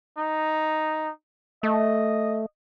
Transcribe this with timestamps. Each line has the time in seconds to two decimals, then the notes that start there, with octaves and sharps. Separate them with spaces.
0.17 D#4
1.63 A3 D#5